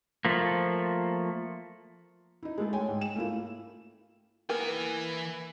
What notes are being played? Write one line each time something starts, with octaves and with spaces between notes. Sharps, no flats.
F3 A3 A#3
D#4 E4
G#3 A3 A4
C#5 G5 G#5
G#2
E7
A3 A#3 E4 F4
E3 A#3 B3 A#4 G#5